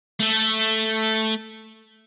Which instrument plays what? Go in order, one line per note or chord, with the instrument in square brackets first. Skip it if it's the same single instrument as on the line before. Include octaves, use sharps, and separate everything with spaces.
[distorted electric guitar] A3 A4